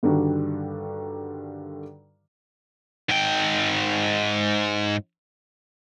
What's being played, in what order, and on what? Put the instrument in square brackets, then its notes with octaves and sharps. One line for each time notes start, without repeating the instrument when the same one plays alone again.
[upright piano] G2 D3 D#3 G3 D4 F#4
[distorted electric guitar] G#2 G5